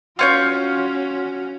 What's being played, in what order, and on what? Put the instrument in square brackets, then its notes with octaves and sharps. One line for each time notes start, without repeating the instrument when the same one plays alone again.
[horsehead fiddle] C#4 F#4 [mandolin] F4 C#5 G6